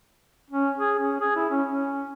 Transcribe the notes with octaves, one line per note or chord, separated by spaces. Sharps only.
C#4
G#4
C#4
G#4
E4
C#4
C#4